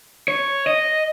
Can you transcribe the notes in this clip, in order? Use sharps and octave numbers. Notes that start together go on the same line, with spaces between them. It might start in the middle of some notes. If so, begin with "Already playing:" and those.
C#5
D#5